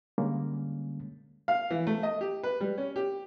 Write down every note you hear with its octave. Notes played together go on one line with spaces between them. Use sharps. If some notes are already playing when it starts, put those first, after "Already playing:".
D3 G3 G#3 A#3 C#4
F5
E3
A3
D#5
G4
B4
G3
C#4
G4